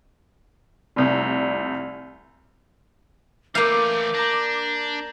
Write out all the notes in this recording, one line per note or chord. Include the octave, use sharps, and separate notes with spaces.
F1 C2
E3 A3 A#3 F5 D6 G6 D#7
D4 A#5 G6 A#6